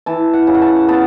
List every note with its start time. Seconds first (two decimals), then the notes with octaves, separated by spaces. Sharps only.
0.06 E3 A5
0.34 F#5
0.47 C#3
0.54 F#5
0.62 A5
0.88 B3 A5